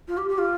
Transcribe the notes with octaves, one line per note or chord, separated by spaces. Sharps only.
F4
G4
G4
F4